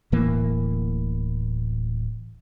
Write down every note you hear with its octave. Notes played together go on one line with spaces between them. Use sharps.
D1 A2 E3 A#3